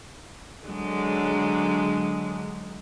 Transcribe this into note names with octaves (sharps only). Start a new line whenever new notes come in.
D3 F#3 G#3